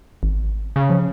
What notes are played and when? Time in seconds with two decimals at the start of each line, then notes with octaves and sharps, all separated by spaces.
0.23 G#1
0.76 C#3
0.90 F3